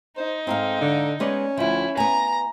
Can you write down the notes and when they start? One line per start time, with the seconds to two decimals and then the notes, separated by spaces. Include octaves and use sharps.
0.17 D#4 C5
0.47 G#2 C4 A4 F5
0.81 D3
1.20 G#3 B3 C#4 D5
1.58 D2 F3 E4
1.97 B3 G#5 A#5